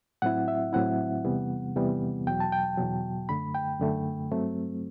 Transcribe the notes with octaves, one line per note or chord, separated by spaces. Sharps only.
A2 F#3 C4 E4 F#5
E5
A2 F#3 C4 E4 F#5
E2 C3 E3 G3 B3
E2 C3 E3 G3 B3
E2 B2 F#3 G5
A5
G5
E2 B2 F#3
F#2 D3 A3 B5
G5
F#2 D3 A3
G2 F#3 A3 C4